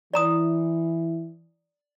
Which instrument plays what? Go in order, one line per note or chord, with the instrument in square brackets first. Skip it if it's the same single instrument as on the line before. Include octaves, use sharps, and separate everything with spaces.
[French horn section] E3 [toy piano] D5 A#5 D#6